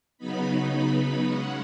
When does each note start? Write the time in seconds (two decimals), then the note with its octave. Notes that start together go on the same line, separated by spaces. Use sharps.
0.18 C#3 F#3 B3 D#4 B5
0.72 B5
1.25 C#3 G#3 C#4 F#5